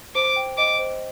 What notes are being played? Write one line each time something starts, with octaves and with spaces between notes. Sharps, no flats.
C5 D6
G5
D#5 D6
C5